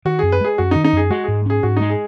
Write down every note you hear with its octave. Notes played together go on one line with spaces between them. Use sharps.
D#3 F#4
F#2 G#4
B4
G#3 G#4
F#2 F#4
D#3 D#4
D#4
F#2 G#4
G#3 F#4
G#2 G#4
C#4 G#4
G#2 F#4
G#3 D#4
G#4